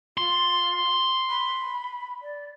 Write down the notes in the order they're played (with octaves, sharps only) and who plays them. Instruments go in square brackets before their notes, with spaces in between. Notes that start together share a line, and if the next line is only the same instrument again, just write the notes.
[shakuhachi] F4 [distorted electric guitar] C6
[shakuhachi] B5
D5